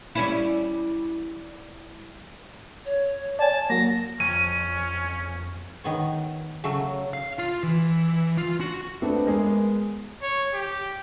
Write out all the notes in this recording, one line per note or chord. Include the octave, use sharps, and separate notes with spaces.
G3 C#4 E4
C#5
D5 G#5 A5
F#3 A#3 A#6
F2 C#4 D#7
D#3 B3 C#5
C#3 F#3 A3
F5
F4
E3
F4
F#4
A3 B3 C4 D4 A4
G#3 B3 G#4 A#4
C#5
G4